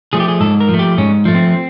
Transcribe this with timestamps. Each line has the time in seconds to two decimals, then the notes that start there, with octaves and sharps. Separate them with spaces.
0.13 F3 A3 G#4
0.20 G4
0.28 G#4
0.40 G#2 A4
0.60 A#4
0.69 F3
0.74 A3
0.79 G4
0.98 G#2 C#4
1.25 F3 A3
1.35 C4